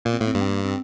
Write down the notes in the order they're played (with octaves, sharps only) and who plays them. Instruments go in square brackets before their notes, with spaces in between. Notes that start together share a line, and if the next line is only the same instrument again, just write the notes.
[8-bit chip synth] A#2 [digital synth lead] A#3
[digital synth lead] C4
[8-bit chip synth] A2 [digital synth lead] A#3
[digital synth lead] C4
[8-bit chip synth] G2 [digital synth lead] A#3
[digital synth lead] C4
A#3
C4